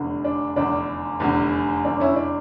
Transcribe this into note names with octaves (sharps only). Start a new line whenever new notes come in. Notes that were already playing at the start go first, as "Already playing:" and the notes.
Already playing: F1 E2 D3
D4
F1 E2 D3 D4
F1 E2 D3
F1 E2 D3 D4
C#4 E4
D4